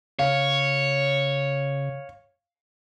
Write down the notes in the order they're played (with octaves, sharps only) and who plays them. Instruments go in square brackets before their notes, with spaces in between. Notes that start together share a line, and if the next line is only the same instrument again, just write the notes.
[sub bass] C#3 [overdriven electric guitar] C#5 [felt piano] F5